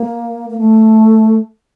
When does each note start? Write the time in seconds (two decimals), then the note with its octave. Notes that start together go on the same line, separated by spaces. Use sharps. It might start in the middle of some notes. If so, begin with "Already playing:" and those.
Already playing: A#3
0.50 A#3
0.58 A3